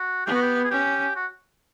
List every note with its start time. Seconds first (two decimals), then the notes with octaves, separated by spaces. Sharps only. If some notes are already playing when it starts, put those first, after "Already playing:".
Already playing: F#4
0.26 B3 G4
0.35 F#4
0.42 G4
0.64 G#4
0.71 C#4 G4
1.16 F#4